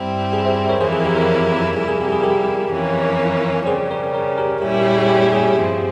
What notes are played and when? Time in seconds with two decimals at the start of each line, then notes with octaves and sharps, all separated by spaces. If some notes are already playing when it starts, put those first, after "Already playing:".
Already playing: G2 G3 C4 E4
0.33 G#4
0.45 C5 E5
0.69 A#4 C#5
0.81 F2 E3 A#3 E4 G#4 C5
0.92 G#4
1.05 G4 A#4
1.16 A#4 C#5
1.76 F2 C3 G3 A#3 E4 G#4
1.88 G#4
2.01 G4
2.12 G#4
2.23 G4 A#4
2.72 F2 E3 A#3 C#4
3.66 C#3 G3 C#4 G#4 C5
3.91 A#4 C#5
4.14 A#4 C#5
4.38 G4 A#4
4.62 A#2 G3 C#4 E4 G4
4.74 G4
4.85 G4
4.97 G#4
5.09 G4
5.33 G#4
5.57 G2 F3 C4